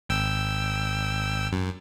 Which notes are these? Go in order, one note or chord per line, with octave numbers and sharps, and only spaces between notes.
G#1 G5 E6
F#2